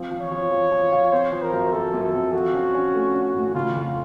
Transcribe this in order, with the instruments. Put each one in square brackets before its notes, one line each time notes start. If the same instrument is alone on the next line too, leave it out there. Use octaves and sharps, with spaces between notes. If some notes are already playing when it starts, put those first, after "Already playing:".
Already playing: [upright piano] F3 C4
F3
[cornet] C#5
[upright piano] F3
F3
F3
F4
[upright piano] C4 [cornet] C5
[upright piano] F3
[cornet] A#4
[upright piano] F#2
[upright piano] F#2 [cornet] A4
[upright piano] F#2
[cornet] A4
[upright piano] C4
[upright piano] F3 [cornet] F#4
[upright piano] C#4
C#4
A3
C#4
A2
[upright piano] C#3 [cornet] F4
[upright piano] F2